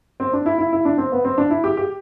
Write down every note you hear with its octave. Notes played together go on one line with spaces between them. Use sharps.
C4
D4
E4
E4
E4
D4
C4
B3
C4
D4
E4
G4
G4